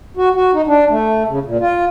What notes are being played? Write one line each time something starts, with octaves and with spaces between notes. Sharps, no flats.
F#4
F#4
D#4
D4
A3
C#3
A#2
F4